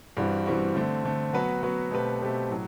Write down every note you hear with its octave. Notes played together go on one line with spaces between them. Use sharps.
G2 E3 G3 C4 F#4
G2 E3 G3 C4 F#4
D3 A3 C4
D3 A3 C4
F#3 B3 F#4 B4
F#3 B3 F#4 B4
B2 A3 C4 G4 B4
B2 A3 C4 G4 B4
A2 F#3